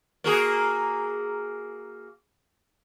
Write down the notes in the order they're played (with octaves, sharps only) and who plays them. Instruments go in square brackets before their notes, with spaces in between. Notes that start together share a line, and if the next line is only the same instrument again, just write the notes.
[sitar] A#3 F#4 G#4